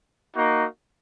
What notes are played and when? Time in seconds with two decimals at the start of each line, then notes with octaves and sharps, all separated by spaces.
0.34 A#3 D#4 F#4